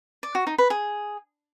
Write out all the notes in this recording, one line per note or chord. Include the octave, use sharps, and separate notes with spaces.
D5
F#4
D#4
B4
G#4